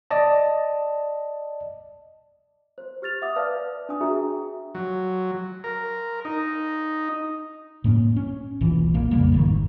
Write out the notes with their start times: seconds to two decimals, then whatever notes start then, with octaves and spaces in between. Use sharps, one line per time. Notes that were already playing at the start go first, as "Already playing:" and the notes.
0.11 D5 D#5 A5
2.78 C5
3.02 G4 F6 A6 F7
3.22 E5 F#5 D6 D#6
3.36 B4 D5 F5 A5 F6
3.89 D4 G#5 D#6
4.01 D4 F#4 G#4 E5 A#5
4.75 F#3
5.64 A#4
6.25 D#4
7.84 A2 A#3 C#4
8.16 C#4
8.61 D#1 B1 A#2 E3
8.94 B1 A#3
9.11 F2 C#3 G3 A#3
9.32 D1 G#1 D#3